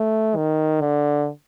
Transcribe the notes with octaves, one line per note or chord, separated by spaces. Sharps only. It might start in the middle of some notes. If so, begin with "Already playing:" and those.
Already playing: A3
D#3
D3